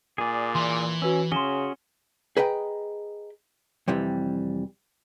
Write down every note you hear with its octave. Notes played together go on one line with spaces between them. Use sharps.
A#2 G#4 D5 G#5 D#7
E3 C6
C#4 F#4 B4 E6
C#3 C#4 F#4 G#4 C6 E7 G7
G#4 B4 D#5 G5 A#5
F2 C3 E3 G3